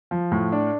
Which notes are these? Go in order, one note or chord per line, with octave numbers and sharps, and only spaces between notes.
F3
A2
D4